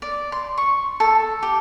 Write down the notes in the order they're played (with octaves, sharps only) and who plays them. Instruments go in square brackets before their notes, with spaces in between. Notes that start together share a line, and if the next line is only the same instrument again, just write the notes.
[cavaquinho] D5
C6
C#6
A4
G4